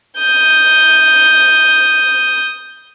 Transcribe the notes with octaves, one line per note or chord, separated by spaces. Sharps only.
D#6 G6